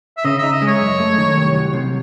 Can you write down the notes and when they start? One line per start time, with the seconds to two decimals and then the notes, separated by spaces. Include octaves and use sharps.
0.17 E5
0.24 C#3 D#5
0.39 D#4 E5
0.53 D#5
0.62 G#3
0.67 C#5
0.81 F#2
1.00 A3
1.18 D#3
1.36 C2
1.55 F#3
1.73 C3